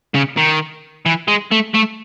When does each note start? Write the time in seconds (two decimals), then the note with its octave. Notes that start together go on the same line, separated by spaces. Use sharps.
0.14 C#3
0.37 D#3
1.06 E3
1.28 G#3
1.52 A3
1.75 A3